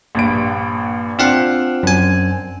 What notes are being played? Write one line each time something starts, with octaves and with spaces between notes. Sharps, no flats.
A#1 G2 D7
C4 D4 F4 F5 F#5
F#2 G#5